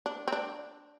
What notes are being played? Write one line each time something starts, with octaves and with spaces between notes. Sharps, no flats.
D4
C4
D4